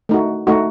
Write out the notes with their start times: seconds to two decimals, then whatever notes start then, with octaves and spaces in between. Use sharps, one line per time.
0.09 A3 D#4 F#4
0.47 A3 D#4 F#4